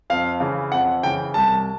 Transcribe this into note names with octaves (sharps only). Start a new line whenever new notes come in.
F2 F5
C#3 E3
F2 F#5
C#3 E3 G5
C2 A5